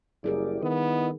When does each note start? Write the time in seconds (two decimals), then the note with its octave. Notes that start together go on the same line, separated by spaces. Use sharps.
0.24 F#1 G3 E4 G4 G#4 A#4 D5
0.63 D#3 B3 E4 D#5